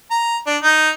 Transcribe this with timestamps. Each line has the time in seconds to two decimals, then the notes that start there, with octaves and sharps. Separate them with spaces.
0.11 A#5
0.46 D4
0.63 D#4